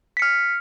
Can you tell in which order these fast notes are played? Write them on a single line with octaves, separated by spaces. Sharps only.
B6 C#7 F6